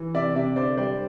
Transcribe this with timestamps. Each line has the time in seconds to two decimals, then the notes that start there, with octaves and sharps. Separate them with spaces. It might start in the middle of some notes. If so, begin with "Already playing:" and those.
Already playing: E3
0.14 C3 D5 E5
0.35 C3 D5 E5
0.56 D3 C5 D5
0.77 G3 C5 D5